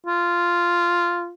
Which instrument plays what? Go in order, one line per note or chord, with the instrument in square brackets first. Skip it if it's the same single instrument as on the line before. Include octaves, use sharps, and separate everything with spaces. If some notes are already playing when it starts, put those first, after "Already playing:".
[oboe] F4